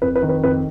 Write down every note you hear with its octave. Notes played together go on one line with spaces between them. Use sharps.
F2 B4
B4
D#3
B4
F2 B4